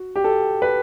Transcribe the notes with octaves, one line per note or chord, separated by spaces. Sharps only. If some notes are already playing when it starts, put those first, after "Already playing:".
Already playing: F#4
G4
A4
B4